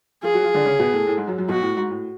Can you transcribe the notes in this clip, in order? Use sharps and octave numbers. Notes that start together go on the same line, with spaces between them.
F3 F4 G#4
F#3 F#4
F3 F4
D3 D4
C#3 C#4
B2 B3
A2 A3
A2 A3
G#2 G#3
F#2 F#3
F#2 F#3
B1 B2 F#4
A2
G#2
A2